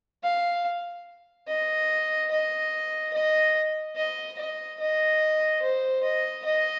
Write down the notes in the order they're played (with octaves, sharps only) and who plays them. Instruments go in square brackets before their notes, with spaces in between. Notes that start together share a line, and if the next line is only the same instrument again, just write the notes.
[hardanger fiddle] F5
D#5
D#5
D#5
D#5
D#5
D#5
C5
D#5
D#5